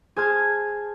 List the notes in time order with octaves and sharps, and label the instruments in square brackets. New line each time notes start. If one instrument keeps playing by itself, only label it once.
[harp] G#4 C5 A5 C6 F6 G#6